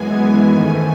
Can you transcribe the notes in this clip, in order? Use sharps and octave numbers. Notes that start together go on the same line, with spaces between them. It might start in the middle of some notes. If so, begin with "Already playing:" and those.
Already playing: F#2 E3 G#3 B3 G#5
G#2 D#3 A3 G#5